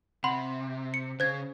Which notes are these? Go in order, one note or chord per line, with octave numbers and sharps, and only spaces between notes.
C3 F#5 B5 C6
C#7
C#3 C5 G#6